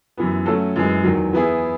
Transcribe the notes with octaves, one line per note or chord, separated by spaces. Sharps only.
F#2 E3 B3
F#3 A3 C#4 F#4 A4
F#2 E3 G#3
E2 D#3 F#3
E3 B3 E4 G#4